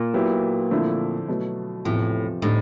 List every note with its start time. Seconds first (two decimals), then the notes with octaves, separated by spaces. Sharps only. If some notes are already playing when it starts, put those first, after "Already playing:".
Already playing: A#2
0.14 F#3 B3 E4 G4
0.71 D3 F3 A3 C4 E4
1.28 B2 F#3 A3
1.85 E2 A2 C3 F3
2.42 A2 D3 G3 C4 D#4